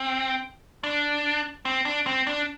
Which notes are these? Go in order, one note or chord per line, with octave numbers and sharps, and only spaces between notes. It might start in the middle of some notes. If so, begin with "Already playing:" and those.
Already playing: C4
D4
C4
D4
C4
D4